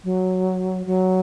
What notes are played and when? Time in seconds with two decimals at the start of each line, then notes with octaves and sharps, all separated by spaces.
0.04 F#3
0.86 F#3